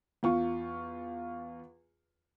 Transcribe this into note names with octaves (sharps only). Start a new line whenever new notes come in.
E2 F4 C#6